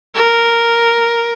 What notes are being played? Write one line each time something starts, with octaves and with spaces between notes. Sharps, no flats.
A#4